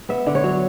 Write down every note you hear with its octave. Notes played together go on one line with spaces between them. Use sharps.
B3 E5
D3
C#5
F#3